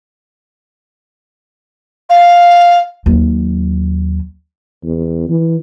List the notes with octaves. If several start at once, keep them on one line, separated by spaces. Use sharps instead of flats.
F5
D#2 F#3
E2
E3